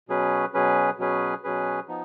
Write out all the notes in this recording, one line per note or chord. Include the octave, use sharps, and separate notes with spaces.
B2 F#3 C#4 G#4 B4
B2 F#3 C#4 G#4 B4
B2 F#3 C#4 G#4 B4
B2 F#3 C#4 G#4 B4
F3 B3 D#4